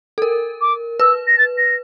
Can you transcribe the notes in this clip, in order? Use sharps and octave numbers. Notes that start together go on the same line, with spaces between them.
A4
A#4
D6
B4 E6
A#6
A6
A#6